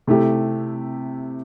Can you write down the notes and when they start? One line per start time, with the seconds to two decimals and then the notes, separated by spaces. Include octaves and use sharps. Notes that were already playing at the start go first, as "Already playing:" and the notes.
0.07 C3 A3 E4 G4